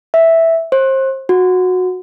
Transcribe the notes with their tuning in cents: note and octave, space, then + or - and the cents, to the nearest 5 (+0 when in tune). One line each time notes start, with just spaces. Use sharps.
E5 -5
C5 +30
F#4 -15